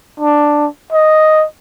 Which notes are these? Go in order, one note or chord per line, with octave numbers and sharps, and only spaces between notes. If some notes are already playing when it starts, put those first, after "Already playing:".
D4
D#5